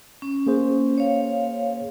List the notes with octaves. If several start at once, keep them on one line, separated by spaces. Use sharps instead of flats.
C#4
A#3 G#4 C5
C#5 F5